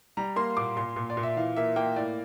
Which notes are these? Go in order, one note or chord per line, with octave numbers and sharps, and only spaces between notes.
G3 A#5
A#3 C6
A#2 D6
A#2 C6
A#2
D5
A#2
E5
E3 F5
A#3 E5
A#3 G5
A2 D5